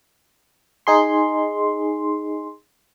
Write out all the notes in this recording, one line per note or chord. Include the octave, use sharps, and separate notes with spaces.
D#4 G#4 C6